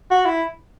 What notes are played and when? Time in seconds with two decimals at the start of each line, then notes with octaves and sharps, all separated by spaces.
0.11 F#4
0.26 E4